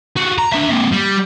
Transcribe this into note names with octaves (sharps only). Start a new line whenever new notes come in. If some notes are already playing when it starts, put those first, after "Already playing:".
F4 F#4
A#5
D4 E5
A#3 C4
G3